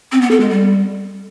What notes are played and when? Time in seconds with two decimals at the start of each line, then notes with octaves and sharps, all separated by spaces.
0.12 C4
0.21 B3
0.31 A4
0.40 G#3
0.50 G3